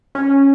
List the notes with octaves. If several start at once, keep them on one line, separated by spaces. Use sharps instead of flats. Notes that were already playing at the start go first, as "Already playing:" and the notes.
C#4